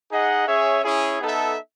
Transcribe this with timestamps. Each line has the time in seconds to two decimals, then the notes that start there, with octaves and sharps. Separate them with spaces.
0.11 D#4 G#4 D#5 F#5
0.47 C#4 G#4 C#5 E5
0.84 C#4 E4 G#4
1.21 B3 D#4 A4 E5